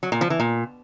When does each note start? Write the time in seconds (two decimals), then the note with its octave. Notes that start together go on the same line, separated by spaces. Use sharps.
0.03 F#3
0.12 A#2
0.21 F3
0.30 E3
0.40 A#2